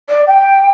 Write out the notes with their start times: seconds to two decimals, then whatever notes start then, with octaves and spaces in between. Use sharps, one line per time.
0.09 D5
0.27 G5